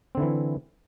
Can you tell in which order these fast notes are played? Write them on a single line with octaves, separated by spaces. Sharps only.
C4 D3 E4 E3